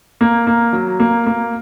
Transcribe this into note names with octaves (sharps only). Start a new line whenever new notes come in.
A#3
A#3
F#3
A#3
A#3